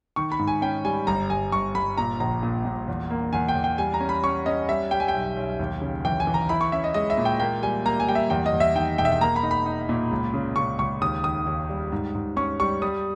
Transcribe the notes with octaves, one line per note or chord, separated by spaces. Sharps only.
D#3 C#6
B5
G#2
G#5
C#4 G5
G3 G#5
G1 A#5
G1 G#5
G1 C#6
G1 B5
A#2 A#5
A#1 A#5
A#2
A#2
E2
A#3
E2 G#5
G5
E2
G5
G3 G#5
A#5
C#4
B5
C#4 C#6
C#4 D#5
G3 E5
G3 G5
G#5
G5
B1
B1
D#2
C#3
E3 G5
G#5
E3
A#5
E4 B5
C#6
C#4 E5
D#5
G#3 D#5
E5
A#2
G5
A#3 G5
G3 G#5
A#3 A#5
G#5
G3 G5
E5
E2 G5
D#5
E2
E5
D#3 G5
E1 G5
E5
G5
A#3 A#5
B5
D#4
B5
D#4
A#2
C#2
C#3
C#3 C#6
C#2 C#6
D#2 D#6
D#3 D#6
D#2
G3
G#2
G#2
C#4 C#6
G3 C#6
G3 D#6